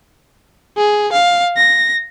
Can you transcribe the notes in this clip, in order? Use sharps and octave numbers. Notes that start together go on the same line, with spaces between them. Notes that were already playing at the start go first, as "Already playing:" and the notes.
G#4
F5
A#6